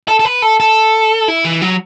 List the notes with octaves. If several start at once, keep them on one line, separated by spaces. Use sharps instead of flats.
A4
A4
B4
A4
A4
E4
E3
F#3